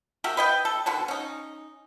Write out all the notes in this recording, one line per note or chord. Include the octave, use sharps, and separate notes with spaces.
F#4 G4 A#4 E5
B4 D#5 G5
A4
B2 D3 D#3
C#4 D#4